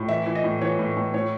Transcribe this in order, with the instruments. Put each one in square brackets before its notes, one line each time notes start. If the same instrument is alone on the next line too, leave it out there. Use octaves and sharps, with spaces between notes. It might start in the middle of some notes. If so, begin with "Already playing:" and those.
Already playing: [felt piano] A2
E3 E5
E3
D#5
A2
E3 C#5
A2
A2
A2 C#5